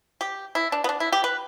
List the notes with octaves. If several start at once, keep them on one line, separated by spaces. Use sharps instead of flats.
G4
E4
D4
B3
D4
E4
G4
B4